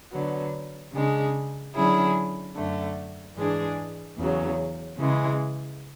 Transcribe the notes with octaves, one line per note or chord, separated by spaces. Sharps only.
D3 F#3 B3
C#3 G#3 D4
D3 F#3 C#4 E4 G#4
F#2 D3 A3
G#2 E3 G#3 D4 G#4
E2 C#3 F#3 C#4
C#3 E3 G#3